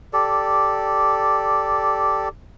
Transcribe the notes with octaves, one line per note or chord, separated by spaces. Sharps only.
G4 A4 D5